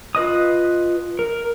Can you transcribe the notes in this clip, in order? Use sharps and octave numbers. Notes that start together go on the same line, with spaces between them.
F4 B4 D#5 D#6
A#4